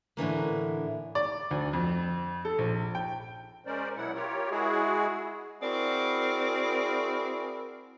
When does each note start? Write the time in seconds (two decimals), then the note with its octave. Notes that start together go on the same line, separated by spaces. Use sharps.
0.17 A2 D3 E3 A#3
1.15 D5
1.51 D2
1.73 F2
2.45 A4
2.58 A#1
2.95 G5
3.66 G#3 C#4 A#4 C5 D5
3.97 B2 F#3 E4 F#5
4.14 F4 G4 A#4 C#5
4.50 G#3 E4 F#4 G#4
5.62 C4 E4 F#4 G#4 A#4 D5